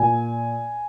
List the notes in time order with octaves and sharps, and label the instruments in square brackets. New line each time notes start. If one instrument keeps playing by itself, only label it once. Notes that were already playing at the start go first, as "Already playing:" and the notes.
Already playing: [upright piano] A#2 G#5